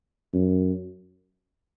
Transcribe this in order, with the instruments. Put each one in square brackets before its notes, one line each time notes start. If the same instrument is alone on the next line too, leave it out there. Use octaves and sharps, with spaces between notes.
[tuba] F#2